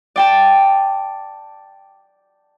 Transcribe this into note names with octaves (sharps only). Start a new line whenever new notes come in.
D5 G5 A5